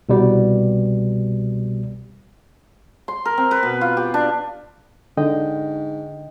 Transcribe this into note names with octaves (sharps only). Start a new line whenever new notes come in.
C2 B2 G3
C6
A#4
C4
B4
B2
F4
G4
D4
G#2 D3 D#5 G5